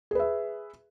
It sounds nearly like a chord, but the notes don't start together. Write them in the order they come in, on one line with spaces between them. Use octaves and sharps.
G#4 B4 E5